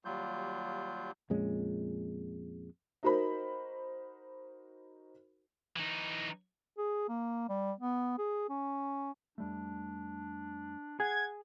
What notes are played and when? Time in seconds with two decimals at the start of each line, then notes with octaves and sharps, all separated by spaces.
0.05 D#2 F#3 G3 F4 G6
1.30 F2 A#2 G#3 C#4
3.03 D#4 F#4 A#4 C5 B5
5.76 E3 D#4
6.78 G#4
7.09 A#3
7.49 G3
7.80 B3
8.18 G#4
8.49 C#4
9.38 F2 G3 A3 D4
11.00 G#4 F#5 G#5 G#6